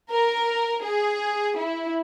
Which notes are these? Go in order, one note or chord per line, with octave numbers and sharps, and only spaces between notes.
A#4
G#4
E4